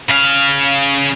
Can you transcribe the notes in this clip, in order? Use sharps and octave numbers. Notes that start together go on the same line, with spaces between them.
C#3 F5